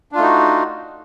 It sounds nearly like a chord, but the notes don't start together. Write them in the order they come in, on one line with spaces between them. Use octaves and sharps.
D4 F4 A3 D#4 F#4